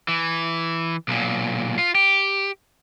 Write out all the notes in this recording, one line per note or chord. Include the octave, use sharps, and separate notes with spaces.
E3
B1 A#2
F4
G4